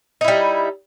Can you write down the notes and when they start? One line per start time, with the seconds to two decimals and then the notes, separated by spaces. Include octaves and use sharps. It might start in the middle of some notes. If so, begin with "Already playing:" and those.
0.21 D#4
0.24 E4
0.28 G3